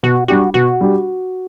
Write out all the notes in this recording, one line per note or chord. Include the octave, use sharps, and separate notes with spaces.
B2 F#4
G3 D4 F#4 G4
B2 F#4
G3 D4 G4